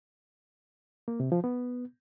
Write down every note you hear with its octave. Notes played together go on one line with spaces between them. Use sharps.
A#3
C3
F3
B3